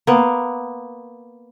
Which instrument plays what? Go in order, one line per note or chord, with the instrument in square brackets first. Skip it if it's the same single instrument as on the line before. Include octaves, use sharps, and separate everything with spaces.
[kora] A#3 B3